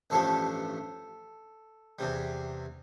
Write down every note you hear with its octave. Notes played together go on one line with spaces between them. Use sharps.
A1 G2 F3 A3 A4
E2 C3 G3